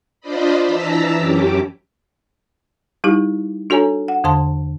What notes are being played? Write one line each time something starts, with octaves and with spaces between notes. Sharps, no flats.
D4 F4 C5 D5 D#5 B5
E3 A5 A#5 E6 B6
F#2 C#4 G4 D6
G3 D#4 E4 G4
D4 F#4 A4 C#5 G#5 A#5
F#5
E2 D3 C5 A5 C6